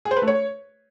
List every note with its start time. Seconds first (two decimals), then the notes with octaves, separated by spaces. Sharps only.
0.05 G#4
0.11 C5
0.16 B4
0.22 A3
0.27 C#5